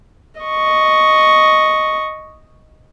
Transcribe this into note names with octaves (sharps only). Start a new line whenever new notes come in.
D#5 C#6